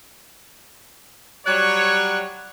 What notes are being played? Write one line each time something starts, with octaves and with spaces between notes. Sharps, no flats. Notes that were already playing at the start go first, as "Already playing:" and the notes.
F#3 G3 C#5 F#6